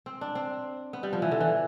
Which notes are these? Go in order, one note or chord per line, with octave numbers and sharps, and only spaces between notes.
C4
D4
C4
B3
G3
F3
E3
D3
E3